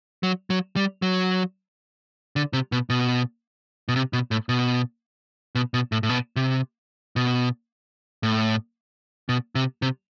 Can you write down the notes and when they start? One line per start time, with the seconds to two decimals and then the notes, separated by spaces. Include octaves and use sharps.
0.23 F#3
0.50 F#3
0.76 G3
1.02 F#3
2.36 D3
2.53 C3
2.72 B2
2.90 B2
3.88 B2
3.96 C3
4.13 B2
4.31 A2
4.49 B2
5.55 B2
5.74 B2
5.92 A2
6.03 A2
6.09 B2
6.36 C3
7.16 B2
8.23 A2
9.29 B2
9.55 C3
9.82 C3